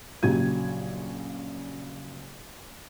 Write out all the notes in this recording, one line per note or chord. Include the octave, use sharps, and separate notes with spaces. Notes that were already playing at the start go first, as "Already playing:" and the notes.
A#1 C#3 F#3 G4 G#6 D#7